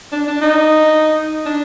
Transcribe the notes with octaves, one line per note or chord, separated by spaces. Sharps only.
D4
D4
D#4
D4